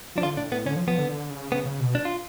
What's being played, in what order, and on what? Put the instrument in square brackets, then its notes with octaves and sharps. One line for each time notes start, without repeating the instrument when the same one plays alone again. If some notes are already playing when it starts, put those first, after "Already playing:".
[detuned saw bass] F3 [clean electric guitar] D4
[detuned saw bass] D3 [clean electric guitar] F4
[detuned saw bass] A2 [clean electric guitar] D4
[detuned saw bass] A2 [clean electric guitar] B3
[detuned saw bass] D3 [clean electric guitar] C#4
[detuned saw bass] F3
[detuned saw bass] F3 [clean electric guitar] B3
[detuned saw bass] D3
D3
C#3
[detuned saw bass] C#3 [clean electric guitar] B3
[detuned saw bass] C#3
B2
[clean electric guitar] D4
F4